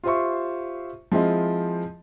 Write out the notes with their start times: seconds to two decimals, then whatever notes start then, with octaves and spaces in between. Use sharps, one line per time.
0.04 F4 G4 C5 E5 C#6
1.12 F3 G#3 C4 E4 F4 D#5